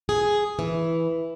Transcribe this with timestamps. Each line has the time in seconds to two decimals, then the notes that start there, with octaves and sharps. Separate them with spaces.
0.09 G#4
0.59 E3